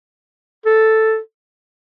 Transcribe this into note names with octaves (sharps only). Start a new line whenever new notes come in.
A4